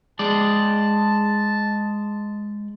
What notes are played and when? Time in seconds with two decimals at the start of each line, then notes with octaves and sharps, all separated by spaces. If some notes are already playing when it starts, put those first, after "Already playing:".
0.19 G#3 D5 A5